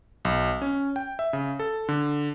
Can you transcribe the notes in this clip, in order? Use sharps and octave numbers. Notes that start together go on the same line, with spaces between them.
B1
C#4
G5
E5
C#3
A4
D3